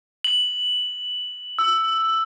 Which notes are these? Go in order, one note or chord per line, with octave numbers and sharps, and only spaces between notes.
F#7
E6